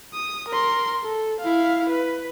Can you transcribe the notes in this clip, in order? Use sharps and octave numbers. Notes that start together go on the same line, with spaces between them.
D#6
A#4 C6
A4
E4 F5
B4